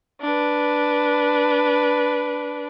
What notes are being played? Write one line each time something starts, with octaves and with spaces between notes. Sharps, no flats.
D4 B4